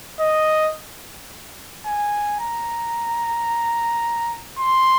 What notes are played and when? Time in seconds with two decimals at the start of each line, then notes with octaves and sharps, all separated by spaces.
0.20 D#5
1.86 G#5
2.40 A#5
4.59 C6